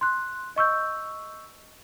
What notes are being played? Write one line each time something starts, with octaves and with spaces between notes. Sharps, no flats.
C6 F#6
D#5 C#6 E6 G6